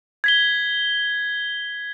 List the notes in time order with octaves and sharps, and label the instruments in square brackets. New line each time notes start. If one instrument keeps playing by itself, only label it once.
[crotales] G#6 B6 G7